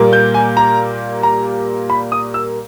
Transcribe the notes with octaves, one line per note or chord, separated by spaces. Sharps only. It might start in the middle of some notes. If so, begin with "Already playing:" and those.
Already playing: A#2 G3 A#3
G6
G#5
A#5
A#5
B5
D#6
E6